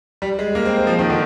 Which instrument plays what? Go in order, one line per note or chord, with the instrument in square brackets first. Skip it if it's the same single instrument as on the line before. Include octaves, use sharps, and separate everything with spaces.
[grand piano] G3
G#3
A#3
C4
C4
F3
D#3
D3